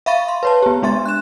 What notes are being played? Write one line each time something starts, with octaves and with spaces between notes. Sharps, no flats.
E5 F5 B5 C#6 A6 D#7
C6
B4 C#5 A5
B3 G4
G#3 D4 E5 C6 A6
F#6 E7